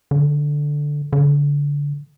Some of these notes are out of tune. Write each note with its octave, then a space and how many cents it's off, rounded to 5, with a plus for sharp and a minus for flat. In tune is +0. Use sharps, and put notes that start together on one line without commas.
D3 +0
D3 -25